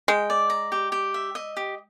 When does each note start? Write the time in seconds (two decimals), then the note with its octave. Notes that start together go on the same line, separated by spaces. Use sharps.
0.08 G#3 G5
0.30 D5
0.50 A#5
0.72 G4
0.92 G4
1.14 E5
1.35 D#5
1.57 G4